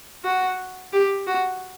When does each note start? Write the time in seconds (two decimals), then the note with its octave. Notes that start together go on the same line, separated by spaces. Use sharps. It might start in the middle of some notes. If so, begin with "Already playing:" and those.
0.24 F#4
0.93 G4
1.27 F#4